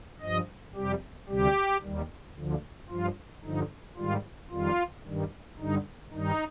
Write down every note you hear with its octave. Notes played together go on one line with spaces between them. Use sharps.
G2 F3 D#5
F2 C3 G3 G4
D2 C3 G3 G4
D#2 D#3 G3
D2 D3 F3
G2 F3 F4
G2 D3 F3 D#4
G#2 D#3 G3 F4
F2 D#3 G3 F4
G2 D#3 G3
G2 D3 G3 D#4
G2 D#3 G3 D#4